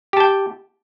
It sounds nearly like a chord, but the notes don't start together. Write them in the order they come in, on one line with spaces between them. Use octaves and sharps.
G4 A5 G5